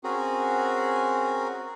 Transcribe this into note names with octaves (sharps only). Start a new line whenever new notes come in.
C4 C#4 F#4 G#4 A#4